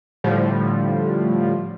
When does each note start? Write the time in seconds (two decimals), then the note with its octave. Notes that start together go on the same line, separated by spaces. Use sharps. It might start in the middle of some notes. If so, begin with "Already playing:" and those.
0.24 A2 D3 F3 G3